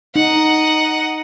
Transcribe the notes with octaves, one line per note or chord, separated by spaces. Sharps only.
D#4 D#5 F#5